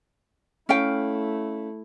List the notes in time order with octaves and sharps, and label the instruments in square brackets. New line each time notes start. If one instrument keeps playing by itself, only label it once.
[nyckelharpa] A3 E4 [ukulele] C#4 F5 G5